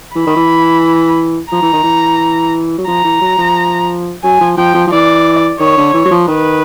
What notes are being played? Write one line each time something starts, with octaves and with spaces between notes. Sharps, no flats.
E3 B5
D#3
E3
F3 A#5
E3
D#3
E3
F#3
F3 A#5
E3
F#3
F3
F#3 G#5
F3
F3 G5
F3
F3
E3 D5
D#3 C#5
D3
E3
F#3
F3
D#3 B4